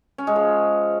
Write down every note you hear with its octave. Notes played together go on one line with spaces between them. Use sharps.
C#4
G#3
F3